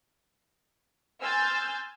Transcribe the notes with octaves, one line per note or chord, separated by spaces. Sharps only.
G#5 C6 E6 F6 G6 A6